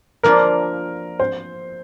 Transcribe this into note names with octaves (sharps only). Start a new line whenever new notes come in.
F3 A#3 D4 F4 A#4
C5